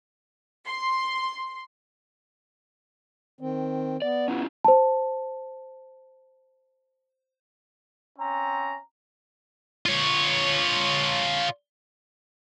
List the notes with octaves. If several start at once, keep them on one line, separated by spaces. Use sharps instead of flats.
C6
D#3 C4
B3 D5
C#4 E4 F4
C5 A5
C4 C#4 A#5
F4 C#5